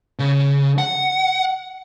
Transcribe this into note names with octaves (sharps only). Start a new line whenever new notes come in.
C#3
F#5